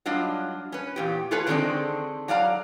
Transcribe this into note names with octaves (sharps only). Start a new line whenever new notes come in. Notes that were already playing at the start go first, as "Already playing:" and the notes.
F#3 G3 D4 F4 D#5
C#4 B4
E2 A#2 G4
A3 F4 G#4 A4 B4 C#5
D3 D#3 G#3 C4 D4 A4
F#3 D5 F5 A5 A#5